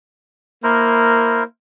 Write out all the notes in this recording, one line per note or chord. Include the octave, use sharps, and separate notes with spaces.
A#3 E4 A#4 C5